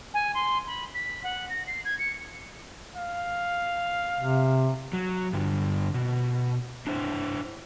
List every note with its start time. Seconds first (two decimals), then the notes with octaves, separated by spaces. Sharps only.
0.13 G#5
0.34 C6
0.66 B5
0.94 B6
1.23 F#5
1.49 A#6
1.67 C7
1.84 G#6
1.98 C#7
2.96 F5
4.19 C3
4.93 F#3
5.33 G2 D3
5.94 B2
6.87 D4 E4 C5